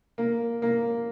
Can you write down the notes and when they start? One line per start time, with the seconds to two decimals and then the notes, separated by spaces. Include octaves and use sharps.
0.18 A#3
0.62 A#3